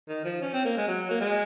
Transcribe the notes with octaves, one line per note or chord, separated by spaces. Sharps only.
D#3
F3
C#4
C4
A#3
G#3
F#3
A#3
G#3